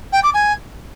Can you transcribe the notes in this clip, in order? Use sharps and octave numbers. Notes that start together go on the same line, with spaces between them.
G5
D6
G#5